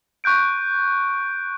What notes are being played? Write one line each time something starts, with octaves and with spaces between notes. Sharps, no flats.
C#6 F#6 G6 D7